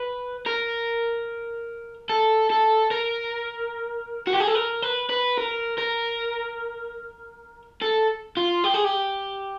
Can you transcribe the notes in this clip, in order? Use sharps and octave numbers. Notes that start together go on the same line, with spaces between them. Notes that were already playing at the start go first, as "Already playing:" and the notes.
Already playing: B4
A#4
A4
A4
A#4
F#4
G4
G#4
A4
A#4
B4
B4
A#4
A#4
A4
F4
G4
G#4
G4